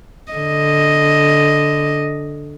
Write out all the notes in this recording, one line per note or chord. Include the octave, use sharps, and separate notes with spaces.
D3 D#5